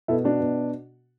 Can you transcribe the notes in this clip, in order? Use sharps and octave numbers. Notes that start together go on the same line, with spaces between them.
B2 E4 A4
D4 F#4
B2